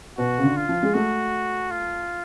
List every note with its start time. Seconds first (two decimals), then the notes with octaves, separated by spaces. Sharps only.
0.18 B2 F#4
0.38 C#3
0.43 D3
0.56 F4
0.69 F3
0.83 G#3
0.94 A3 F#4
1.71 F4